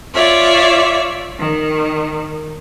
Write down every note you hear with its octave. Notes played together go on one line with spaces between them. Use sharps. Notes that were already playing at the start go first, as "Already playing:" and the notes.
F4 C#5 D5 E5
D#3